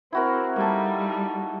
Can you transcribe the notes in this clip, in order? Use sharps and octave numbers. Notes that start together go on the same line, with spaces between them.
C4 E4 F#4 A#4
G3 A#3 D#4 A4